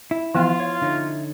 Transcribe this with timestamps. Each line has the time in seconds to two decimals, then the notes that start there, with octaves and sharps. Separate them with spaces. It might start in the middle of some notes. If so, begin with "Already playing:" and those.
0.11 E4
0.35 E3 F3 B3 F4 G5
0.60 C#5
0.82 D3 D#4 C#5